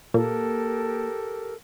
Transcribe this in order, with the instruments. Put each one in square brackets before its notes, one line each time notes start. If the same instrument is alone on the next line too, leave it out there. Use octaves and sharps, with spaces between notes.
[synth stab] A#2 [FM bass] A#3 [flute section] G4 A4 A#4